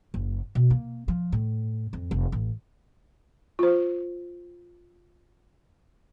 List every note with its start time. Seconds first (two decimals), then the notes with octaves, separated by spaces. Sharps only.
0.14 F#1
0.55 B2
0.70 A#3
1.08 F3
1.32 A2
1.93 F2
2.11 F1
2.32 A1
3.59 F4 C5